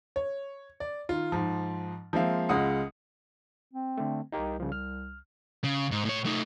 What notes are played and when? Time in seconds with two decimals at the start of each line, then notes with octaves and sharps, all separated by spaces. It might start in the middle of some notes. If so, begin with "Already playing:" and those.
0.16 C#5
0.80 D5
1.09 D#3 F4
1.32 G#2 F3
2.13 F3 G#3 A#3 C4 E5 F5
2.49 C#2 G#3 F4 F#5 D#6 C#7
3.73 C4
3.98 D3 A3
4.32 C2 D#4 G4 A#4
4.60 C#3 F3
4.72 F6
5.64 C#3
5.92 G#2
6.05 A2 C#5
6.25 A3 D#4